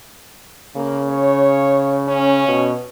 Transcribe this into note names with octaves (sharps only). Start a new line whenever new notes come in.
C#3 A#3
C#5
C#4
B2